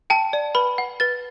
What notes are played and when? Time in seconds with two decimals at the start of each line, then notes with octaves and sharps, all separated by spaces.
0.10 G5 A5
0.33 D5
0.55 B4 B5
0.78 F#5
1.00 B4 A6